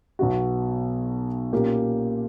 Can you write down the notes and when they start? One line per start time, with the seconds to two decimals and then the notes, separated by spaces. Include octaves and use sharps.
0.19 B1 B2 F#3 B3 F#4
1.53 A#2 A#3 C#4 G4